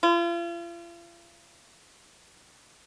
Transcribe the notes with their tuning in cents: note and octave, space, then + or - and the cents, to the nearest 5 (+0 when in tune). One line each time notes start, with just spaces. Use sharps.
F4 -40